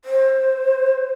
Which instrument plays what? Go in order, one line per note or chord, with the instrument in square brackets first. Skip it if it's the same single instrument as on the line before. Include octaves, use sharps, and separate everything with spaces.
[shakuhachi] C5